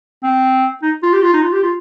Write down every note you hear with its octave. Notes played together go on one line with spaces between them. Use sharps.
C4
D#4
F4
G4
F4
D#4
F4
G4
F4